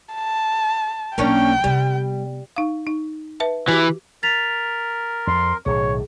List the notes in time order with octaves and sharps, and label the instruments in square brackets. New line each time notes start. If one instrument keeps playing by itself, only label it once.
[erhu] A5
[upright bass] B1 F#3 [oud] A#3 C#4 D4 [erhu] G5
[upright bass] C3 B3 [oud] G3
[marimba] D#4 F5
D#4
B4 E5 A5
[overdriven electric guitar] E3 [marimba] F#4 G4 D6
[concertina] A#4 [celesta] A6 B6 F7
[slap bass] F2 [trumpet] C6
[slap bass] B1 A2 D#3 [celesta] G#4 [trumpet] C#5